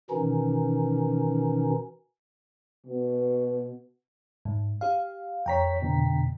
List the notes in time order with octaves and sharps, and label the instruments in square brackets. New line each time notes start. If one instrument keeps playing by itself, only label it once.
[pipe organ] B2 D#3 E3 C#4 D#4
[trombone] B2
[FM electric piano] G#2
G4 F5
[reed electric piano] F2 C#5 [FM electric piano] G5 A#5 B6
[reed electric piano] F2 B2 D3